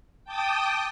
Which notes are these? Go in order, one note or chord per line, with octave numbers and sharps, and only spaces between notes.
G5 A5 D6 D#6